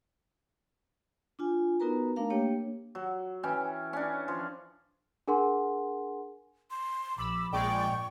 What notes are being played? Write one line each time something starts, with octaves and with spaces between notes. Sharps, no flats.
D4 F4 G#5
B3 D#4 F#4 A#4 B4 A#5
A3 D4 A#4 F5 A#5
A#3 D4 G4 C#5 G5
F#3
E3 C#4 G5
C#4 D4
F3
D4 G#4 A#4 F#5 G#5 C6
C6
A#1 B5 D6 E6
A#1 A#2 G#3 D5 G5 C#6